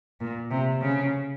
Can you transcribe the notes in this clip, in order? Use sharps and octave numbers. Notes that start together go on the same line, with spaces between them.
A#2
C3
C#3